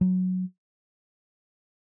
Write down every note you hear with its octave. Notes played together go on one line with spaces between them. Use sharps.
F#3